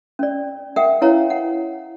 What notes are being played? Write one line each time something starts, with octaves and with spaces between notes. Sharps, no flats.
C#4 D5
A#4 E5 F#5 G5
C#4 E4 B4 C#5 F5 A#5
F#5